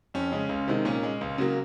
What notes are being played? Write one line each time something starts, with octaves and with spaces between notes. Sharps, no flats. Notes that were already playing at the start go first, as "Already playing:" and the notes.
F2 C#4
C#3 G#3
C#2
C3 D#3 G#3
A#2 C#4
G#3
C#2
C#3 F#3 A#3